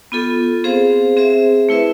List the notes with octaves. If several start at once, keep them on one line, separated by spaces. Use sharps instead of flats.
B3 F4 A4
C4 G#4 C5 F5
C4 G#4 C5 E5
A3 E4 B4 E5